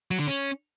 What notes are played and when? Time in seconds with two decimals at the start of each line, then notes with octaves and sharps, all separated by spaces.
0.11 F#3
0.19 D3
0.27 C#4